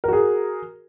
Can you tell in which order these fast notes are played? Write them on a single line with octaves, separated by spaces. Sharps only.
A#4 F#4 G#4